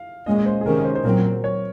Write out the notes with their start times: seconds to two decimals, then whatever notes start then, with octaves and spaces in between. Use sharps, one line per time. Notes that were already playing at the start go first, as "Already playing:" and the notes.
Already playing: F5
0.26 A#2 G#3 C#4 D#5
0.46 C5
0.61 G#4
0.65 C3 D#3 G#3 C#4 A#4
0.85 C5
0.95 C5
1.04 A#2 F#3 C4 A#4
1.44 C#5